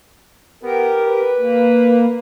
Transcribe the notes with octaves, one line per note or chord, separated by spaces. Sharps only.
B3 G4 A#4
B4
A#3